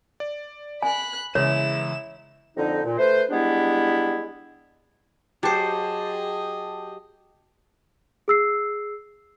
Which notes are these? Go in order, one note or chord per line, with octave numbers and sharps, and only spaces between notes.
D5
G#5 B5 F#6
E2 C#3 E3 G#3 E4 C#5 E7
F2 D3 D#4
A#2
A3 B4 C5
G3 G#3 B3 D4 E4
F#3 G4 G#4 C5 D#5 A5
G#4 E6 C7